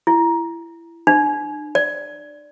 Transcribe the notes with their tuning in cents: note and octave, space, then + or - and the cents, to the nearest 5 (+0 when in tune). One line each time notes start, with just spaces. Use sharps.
E4 +25
D4 +40
D5 -10